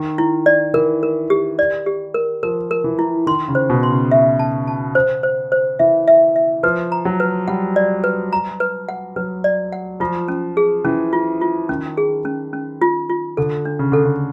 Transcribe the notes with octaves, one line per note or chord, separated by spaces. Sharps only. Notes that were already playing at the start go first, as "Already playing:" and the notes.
Already playing: D#3
E4
D5
E3 A#4
A#4
G4
D5
G4
A#4
F3 A#4
A#4
E3
E4
D#3 C6
C#3
C5
B2
C6
C#3
E5
A5
A5
C5
C5
C5
E3 E5
E5
E5
F3 B4
A#5
F#3
B4
G3 F#5
D5
B4
A#5
B4
F#5
F#3 B4
D5
F#5
F3 F4
C#4
G#4
E3 C#4
F4
F4
D#3 C#4
G#4
C#4
C#4
F4
F4
D3 A4
D4
C#3
D3 A4
C#3